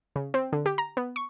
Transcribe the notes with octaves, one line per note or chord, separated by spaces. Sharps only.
C#3
C4
D3
G4
A#5
B3
C#6